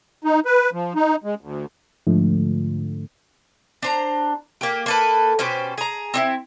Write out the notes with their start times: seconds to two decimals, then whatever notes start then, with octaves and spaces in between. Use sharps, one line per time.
0.24 D#4
0.45 B4
0.73 F3
0.95 D#4
1.24 G#3
1.41 D2
2.07 G#2 D3 F3 A3
3.82 D4 C5 A#5
4.61 A#3 G4
4.86 A#3 A4 B4
5.39 B2 C#4 G4 C5
5.78 G#4 A#5
6.14 C4 D#4 E4